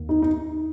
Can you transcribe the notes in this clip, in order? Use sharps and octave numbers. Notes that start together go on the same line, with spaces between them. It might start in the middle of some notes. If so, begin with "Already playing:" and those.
Already playing: D#2 D#3 A#3
D#4
D#4